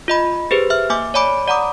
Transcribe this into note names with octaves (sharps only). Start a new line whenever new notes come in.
F4 D#5 B5
G4 G#4 B4 C5
E5 F6
A#3 E5 G#5 D6
C#5 D5 G#5 B5 D6 D7
D5 F#5 A#5 B5 D6 D#6